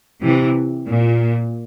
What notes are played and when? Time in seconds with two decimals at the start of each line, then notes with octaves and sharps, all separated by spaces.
0.23 C3 E3
0.87 A#2